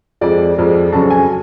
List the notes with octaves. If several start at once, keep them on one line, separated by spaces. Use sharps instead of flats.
F2 F3 G#3 D5
F2 F3 G#3
F2 C#3 F#3 A5
G#5